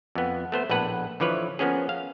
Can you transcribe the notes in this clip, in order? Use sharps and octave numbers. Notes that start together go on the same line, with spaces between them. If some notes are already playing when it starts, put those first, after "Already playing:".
F2 B3
A3 B3 C5
A#1 A2 B3 B4 F#5
D3 E3 F3 B4 C#5
F3 A#3 B3 C#4 G#4
F5